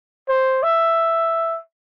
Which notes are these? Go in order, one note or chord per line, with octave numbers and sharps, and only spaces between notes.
C5
E5